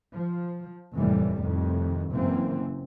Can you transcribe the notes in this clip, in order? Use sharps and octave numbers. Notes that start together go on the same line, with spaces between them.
F3
F1 D#2 A2 C3 E3 G3
F2 A2 C3 D#3
F#1 F#2 E3 A#3 C4